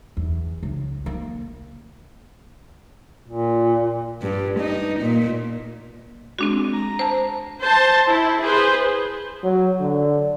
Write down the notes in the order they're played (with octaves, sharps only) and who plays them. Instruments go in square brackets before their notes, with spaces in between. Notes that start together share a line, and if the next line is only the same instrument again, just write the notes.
[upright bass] E2
C#2
A#3
[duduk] A#2
[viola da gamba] G2
D#4
A#2
[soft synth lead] G#3 [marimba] C4 D4 F#4
[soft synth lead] A#5
[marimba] C5 A5
[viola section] C5 A5
E4
G#4 B4 C5
[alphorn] F#3
D3